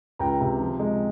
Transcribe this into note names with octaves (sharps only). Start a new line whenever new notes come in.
C#2 G5 A#5
C3
F3
G#3